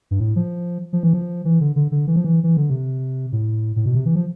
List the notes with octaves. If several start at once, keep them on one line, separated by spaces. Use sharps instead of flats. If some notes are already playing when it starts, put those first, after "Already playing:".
G2
A2
F3
F3
E3
F3
E3
D3
D3
D3
E3
F3
E3
E3
D3
C3
A2
A2
B2
C3
E3
F3